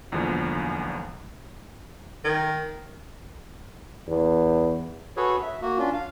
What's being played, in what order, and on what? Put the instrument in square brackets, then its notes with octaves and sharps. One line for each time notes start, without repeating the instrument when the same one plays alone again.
[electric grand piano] B1 E2 D3 F3 G#3 A#3
[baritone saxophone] D#3
[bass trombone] E2
[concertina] F#4 G#4 A4 B4 C#5
E5
A#3 F#4
C#4 D4 F4
F5